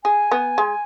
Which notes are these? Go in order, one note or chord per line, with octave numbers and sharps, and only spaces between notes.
G#4 G#5
B3
G#3